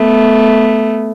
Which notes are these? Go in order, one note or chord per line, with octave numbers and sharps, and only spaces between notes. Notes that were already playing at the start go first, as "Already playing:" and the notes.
Already playing: A3 B3